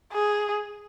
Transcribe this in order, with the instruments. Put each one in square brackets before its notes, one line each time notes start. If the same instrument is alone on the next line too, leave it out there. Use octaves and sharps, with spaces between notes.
[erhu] G#4